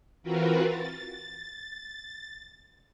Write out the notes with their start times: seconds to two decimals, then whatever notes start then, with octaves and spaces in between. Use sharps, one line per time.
0.23 E3 C4 F4 F#4 A#4 B4
0.63 A6